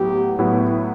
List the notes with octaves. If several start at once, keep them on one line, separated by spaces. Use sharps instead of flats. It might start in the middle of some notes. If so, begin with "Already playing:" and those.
Already playing: A2 F#3 B3 E4 G4
A2 F#3 B3 E4